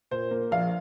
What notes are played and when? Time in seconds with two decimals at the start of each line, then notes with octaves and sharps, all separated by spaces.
0.11 A#2 C5
0.31 A#3
0.51 A#1 F5